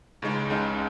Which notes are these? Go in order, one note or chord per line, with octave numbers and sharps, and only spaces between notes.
C#2 C#3 G#3 D#4
C#2 C#3 G#3 D#4